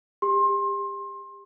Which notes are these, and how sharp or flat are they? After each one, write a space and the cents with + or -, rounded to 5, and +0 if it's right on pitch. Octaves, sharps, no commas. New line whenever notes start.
G4 +30 C6 +25